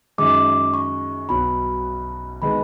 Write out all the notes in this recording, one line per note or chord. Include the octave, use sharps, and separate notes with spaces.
F#2 D#3 G#3 D6
C#6
B1 B2 F#3 B5
D#3 G#3 B3 B5